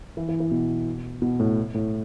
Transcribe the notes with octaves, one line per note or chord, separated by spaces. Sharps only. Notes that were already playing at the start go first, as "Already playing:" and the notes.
E3
E3
E3
B2
B2
A2
A2